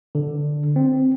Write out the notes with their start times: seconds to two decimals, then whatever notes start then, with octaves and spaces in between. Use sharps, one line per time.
0.15 D3
0.76 C4